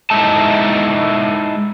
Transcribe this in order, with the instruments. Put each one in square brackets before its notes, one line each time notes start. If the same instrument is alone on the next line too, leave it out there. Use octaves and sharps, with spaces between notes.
[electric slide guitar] G#3 D#4 E4 E5 A5